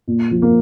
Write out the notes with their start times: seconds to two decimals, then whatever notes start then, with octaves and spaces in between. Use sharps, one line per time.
0.07 A#2
0.31 F3
0.42 A#3